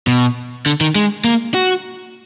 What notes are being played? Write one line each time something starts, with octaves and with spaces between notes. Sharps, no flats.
B2
D3
D#3
G#3
A#3
F#4